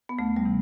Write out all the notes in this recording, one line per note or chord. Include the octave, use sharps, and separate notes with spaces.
B3
D2 A3
G3
C3 E3